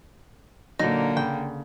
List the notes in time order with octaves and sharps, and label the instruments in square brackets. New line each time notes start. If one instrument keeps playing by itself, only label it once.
[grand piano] A#2 F#3 [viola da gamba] D3 A#3 [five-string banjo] D#4
[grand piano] C#3 [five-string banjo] G5